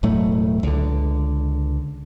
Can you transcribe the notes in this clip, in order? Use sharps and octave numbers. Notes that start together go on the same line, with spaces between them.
E1 A2 F#3 A3
C#2 D3